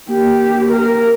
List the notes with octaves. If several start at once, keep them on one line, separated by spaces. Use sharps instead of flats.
A#3 G4
A#4